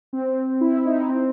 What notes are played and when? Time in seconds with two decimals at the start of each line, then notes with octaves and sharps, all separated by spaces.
0.13 C4
0.61 E4
0.85 D#4
1.09 C4